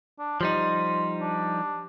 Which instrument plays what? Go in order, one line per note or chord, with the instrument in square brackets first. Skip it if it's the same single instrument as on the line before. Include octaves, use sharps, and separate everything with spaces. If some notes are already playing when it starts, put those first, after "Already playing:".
[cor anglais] D4
[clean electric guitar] F3 G3 D#4 [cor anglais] C5
[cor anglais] D4